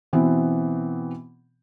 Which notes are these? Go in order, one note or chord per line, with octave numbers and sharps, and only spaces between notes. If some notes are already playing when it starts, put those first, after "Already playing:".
B2 E3 B3 C4